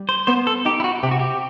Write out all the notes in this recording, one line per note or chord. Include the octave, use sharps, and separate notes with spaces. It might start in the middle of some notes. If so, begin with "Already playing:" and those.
Already playing: G3
C5
B3 C5
A4
D#4 G4
E4
F#4
C3 G4
F#4
G4